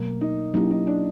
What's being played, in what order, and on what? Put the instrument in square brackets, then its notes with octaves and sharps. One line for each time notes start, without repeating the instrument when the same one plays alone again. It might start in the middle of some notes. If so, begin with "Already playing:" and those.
Already playing: [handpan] B2 F#3 A3 [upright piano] A#3
[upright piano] D#4
[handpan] F#3 A#3 C#4 E4 G4 [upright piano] D#4
[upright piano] D#4
D4